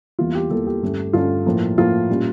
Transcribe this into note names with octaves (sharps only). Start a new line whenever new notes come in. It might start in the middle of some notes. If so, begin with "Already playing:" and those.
E2 E3 G3 A#3 F4
G4
E2 E3 G3 A#3 A4
G4
G2 D3 A3 C#4
G2 D3 A3 C#4 F4
A2 F3 A#3
A2 F3 A#3 F4
A#2 G3 C#4